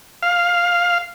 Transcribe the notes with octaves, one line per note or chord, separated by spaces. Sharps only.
F5